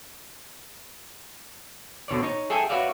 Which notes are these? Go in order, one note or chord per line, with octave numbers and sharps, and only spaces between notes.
B2 D3 C#5 D5
D#4 C#5
G#4 A4 E5 G5 G#5
F#4 B4 C#5 D5 E5 F5